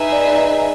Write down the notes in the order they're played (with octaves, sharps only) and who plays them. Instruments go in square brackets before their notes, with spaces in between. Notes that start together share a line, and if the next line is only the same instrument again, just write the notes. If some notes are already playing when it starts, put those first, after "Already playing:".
Already playing: [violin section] D#4 G#4 B4 E5
[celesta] D5
D#5